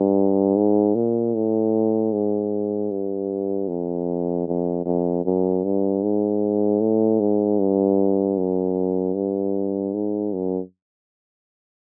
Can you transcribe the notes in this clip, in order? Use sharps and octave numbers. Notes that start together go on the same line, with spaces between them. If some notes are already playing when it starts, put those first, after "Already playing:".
Already playing: G2
G#2
A#2
A2
G#2
G2
F2
F2
F2
F#2
G2
G#2
A2
G#2
G2
F#2
G2
G#2
F#2